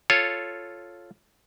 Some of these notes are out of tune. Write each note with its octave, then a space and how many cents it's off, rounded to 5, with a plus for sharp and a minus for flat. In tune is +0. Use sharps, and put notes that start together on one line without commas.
F4 +0 A4 +0 C#5 +0